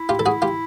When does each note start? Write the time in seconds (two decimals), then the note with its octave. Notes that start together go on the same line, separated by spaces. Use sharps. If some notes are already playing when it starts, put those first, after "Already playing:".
Already playing: E4
0.09 F4 G4
0.19 A4
0.26 F#4 G#4
0.42 F4 G4